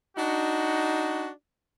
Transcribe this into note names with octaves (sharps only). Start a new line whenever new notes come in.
D4 D#4 F#4